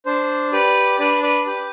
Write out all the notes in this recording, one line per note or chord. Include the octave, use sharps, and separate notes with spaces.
D4 C5
G4 B4 D5
D4 B4 D5
B4 D5
G4 B4